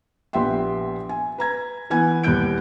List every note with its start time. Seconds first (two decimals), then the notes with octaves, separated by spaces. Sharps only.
0.33 A#1 B3 G4 E5 G5 C6
1.09 G#5
1.38 B4 A#5 G#6
1.90 E3 B3 G#5 G#6
2.23 D#2 G3 B3 F#6 G6 D7